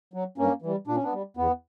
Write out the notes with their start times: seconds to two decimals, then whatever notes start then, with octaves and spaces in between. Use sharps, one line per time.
0.14 F#3
0.38 G2 A#3 C#4
0.62 E3 G3
0.87 A#2 D4
0.96 C#4
1.03 B3 D4
1.12 G3
1.37 E2 B3